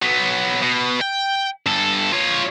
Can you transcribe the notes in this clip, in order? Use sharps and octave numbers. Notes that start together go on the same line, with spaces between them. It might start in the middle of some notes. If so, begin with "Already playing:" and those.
F#3 B3
B2
G5
G2 A4
F4 C#5